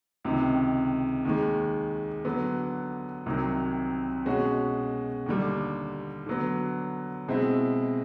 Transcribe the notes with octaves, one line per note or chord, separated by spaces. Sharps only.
C#2 C3 D#3
D#2 D#3 G#3
D3 F#3 B3
C2 C3 D#3 F#3
B2 G#3 C#4 F#4
D#2 D3 G3
D3 F#3 B3
B2 G#3 C4 E4